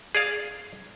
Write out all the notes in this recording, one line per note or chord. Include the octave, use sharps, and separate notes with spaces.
G#4 D5 F5